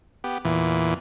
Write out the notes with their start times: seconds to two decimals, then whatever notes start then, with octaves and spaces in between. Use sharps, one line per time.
0.24 B3 G4
0.45 E2 A#2 E3